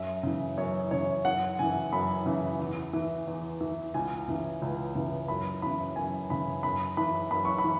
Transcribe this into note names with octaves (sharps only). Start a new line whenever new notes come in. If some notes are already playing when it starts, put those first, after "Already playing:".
Already playing: F#2 E5
C#3 E3
F#2 C#5
C#3 E3 C#5
F#2 F#5
C#3 E3 G#5
F#2 B5
C#3 E3
E2
E3
E2
E3
C#2 G#5
C#3 E3
C#2
C#3 E3
F#2 B5
C#3 E3 B5
F#2 G#5
C#3 E3 B5
F#2 B5
E3 B5
F#2 B5
C#6
B5
E3